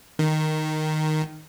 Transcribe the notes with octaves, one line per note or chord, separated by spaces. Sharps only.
D#3